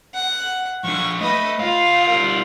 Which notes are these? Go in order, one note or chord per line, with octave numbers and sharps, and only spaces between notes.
F#5
F3 D4 C#6
A3 B4 D#5
D2 F4 F5
G3 A#4